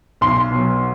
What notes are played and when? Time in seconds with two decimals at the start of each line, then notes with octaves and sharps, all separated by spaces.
0.21 B1 C6
0.51 B2 F#3